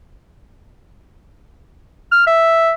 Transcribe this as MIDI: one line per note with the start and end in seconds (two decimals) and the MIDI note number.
2.12 2.22 89
2.26 2.72 76